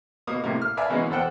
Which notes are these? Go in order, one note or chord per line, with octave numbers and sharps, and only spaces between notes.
B2 A#3 D#6
A2 C3 A#3
F6
A#4 B4 D5 E5 F5 G#5
B2 E3 G#3 A#3 B3 C#4
E2 A4 C5 F#5 G5 F#6